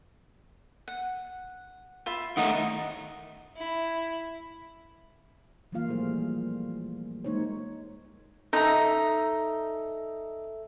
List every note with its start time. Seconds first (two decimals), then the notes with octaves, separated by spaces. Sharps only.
0.88 F#5
2.06 F4 E5 B5
2.37 D#3 A3 D#4 E4 F#5 D#6
3.56 E4
5.72 E3 F#3 G3 A#3 F4 F5
5.88 A#2 F3 G3 A3 G#4 C5
7.24 G#3 A#3 D#4 C5 C#5
8.53 D#4 A4 E5 A#5